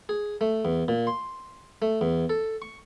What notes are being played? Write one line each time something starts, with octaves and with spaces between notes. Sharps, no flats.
G#4
A3
E2
A#2
C6
A3
E2
A4
C#6